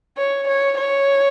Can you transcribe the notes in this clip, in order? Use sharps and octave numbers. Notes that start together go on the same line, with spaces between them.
C#5
C#5
C#5